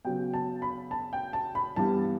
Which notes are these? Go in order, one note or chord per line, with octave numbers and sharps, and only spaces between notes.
C#3 F#3 B3 G5
A5
B5
A5
G5
A5
B5
G2 E3 G3 B3 A5